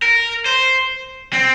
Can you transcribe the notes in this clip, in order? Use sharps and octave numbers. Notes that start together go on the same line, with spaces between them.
A#4
C5
C4